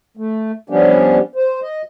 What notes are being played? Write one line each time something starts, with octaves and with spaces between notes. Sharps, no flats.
A3
F3 G3 B3 C#4 D4 G4
C5
D#5